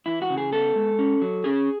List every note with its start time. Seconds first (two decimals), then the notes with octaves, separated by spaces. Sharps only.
0.06 E3 E4
0.22 F#4
0.30 C#3
0.38 G#4
0.53 B3 A4
0.76 G#3
0.99 C#4
1.22 F#3
1.44 C#4 G#4